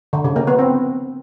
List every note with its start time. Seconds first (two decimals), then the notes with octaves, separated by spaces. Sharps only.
0.13 D3
0.24 C#3
0.36 A#3
0.47 B3
0.59 C4